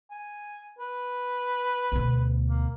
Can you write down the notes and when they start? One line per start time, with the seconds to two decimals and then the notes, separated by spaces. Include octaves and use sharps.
0.11 G#5
0.79 B4
1.92 D2 B2
2.48 A#3